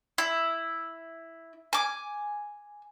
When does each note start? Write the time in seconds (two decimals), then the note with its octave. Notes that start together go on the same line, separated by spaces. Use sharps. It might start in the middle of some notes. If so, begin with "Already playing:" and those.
0.18 E4
1.73 G#5 D6